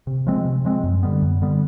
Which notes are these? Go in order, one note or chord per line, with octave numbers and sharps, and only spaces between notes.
C3
F3 G#3 C4
C3
F3 G#3 C4
F#2
D3 G3 B3
F#2
D3 G3 B3